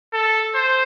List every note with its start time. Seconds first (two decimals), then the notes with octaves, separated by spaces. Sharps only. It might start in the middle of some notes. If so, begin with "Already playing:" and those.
0.13 A4
0.55 C5